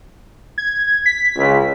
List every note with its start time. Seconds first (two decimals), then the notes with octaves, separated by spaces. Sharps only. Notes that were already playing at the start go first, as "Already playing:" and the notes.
0.58 G#6
1.06 B6
1.37 C#2